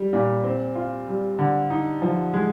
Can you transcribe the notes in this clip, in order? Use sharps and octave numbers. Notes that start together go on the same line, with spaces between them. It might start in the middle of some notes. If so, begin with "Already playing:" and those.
Already playing: G3
A#2
C4
F4
G3
D3
D#4
F3
G#3